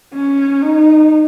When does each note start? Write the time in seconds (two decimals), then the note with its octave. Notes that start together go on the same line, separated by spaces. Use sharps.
0.14 C#4
0.62 D#4